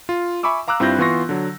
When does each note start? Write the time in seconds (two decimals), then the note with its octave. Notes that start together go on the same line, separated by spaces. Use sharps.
0.09 F4
0.43 E5 G#5 B5 C#6 D6 E6
0.68 F5 A#5 D6 E6 F#6
0.80 G2 C4 E4 F4 G6 A#6
0.99 E3 B3 F4 C6 C#6 A#6
1.29 D3 F#3